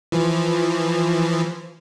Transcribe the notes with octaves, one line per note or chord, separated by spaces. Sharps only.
E3 F3